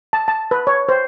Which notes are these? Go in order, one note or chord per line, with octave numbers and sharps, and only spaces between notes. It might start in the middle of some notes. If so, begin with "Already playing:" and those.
A5
A5
B4
C#5
C5